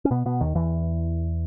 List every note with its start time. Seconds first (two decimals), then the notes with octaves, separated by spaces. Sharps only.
0.05 C#4
0.11 B2 B3
0.26 B2 B3
0.41 D#2 D#3
0.55 E2 E3